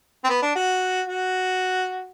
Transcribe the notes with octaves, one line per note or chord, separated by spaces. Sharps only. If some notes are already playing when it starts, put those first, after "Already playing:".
C4
B3
D4
F#4
F#4